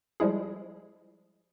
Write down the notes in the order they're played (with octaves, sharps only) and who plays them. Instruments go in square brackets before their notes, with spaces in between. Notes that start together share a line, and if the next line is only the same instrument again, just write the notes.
[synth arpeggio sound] F3 G3 G#3 E4 G#4